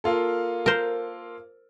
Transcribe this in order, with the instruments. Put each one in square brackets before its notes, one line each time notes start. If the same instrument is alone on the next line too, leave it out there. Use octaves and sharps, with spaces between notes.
[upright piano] A#3 F4 A4
[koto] A#4 C5